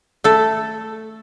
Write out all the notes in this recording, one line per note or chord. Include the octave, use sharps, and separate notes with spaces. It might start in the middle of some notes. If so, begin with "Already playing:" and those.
A3 A4